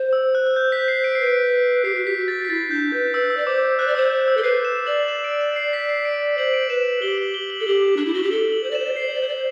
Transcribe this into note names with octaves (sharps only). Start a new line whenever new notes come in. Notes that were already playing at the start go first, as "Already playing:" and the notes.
Already playing: C5
E6
F#6
F#6
G6
B6
C7
D7
C7
B4
D7
G4 C7
F#4 C7
G4 B6
F#4
A6
B6
E4 A6
D4 G6
B4 G6
B4 E6
E6
D5
C5 D6
C5 F#6
D5
C5 E6
E6
E6
A4
B4 C7
E7
D5 F#7
E7
D7
E7
C7
B6
C7
D7
C5 F#7
D7
B4 E7
G4 G7
F#7
G7
F#7
A4
G4 G7
D4 F#7
E4
F#4 G7
G4
A4 G7
F#7
C5
D5
C5 E7
D5
C5
D5 C7
C5
D5
C5
D5
C5